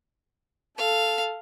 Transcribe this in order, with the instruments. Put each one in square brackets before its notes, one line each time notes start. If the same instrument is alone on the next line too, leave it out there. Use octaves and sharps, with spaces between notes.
[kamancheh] A4 [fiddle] F5